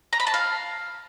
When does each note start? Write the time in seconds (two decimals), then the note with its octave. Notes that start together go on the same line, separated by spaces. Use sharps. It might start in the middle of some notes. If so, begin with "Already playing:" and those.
0.13 A#5
0.20 B5
0.27 A5
0.34 F5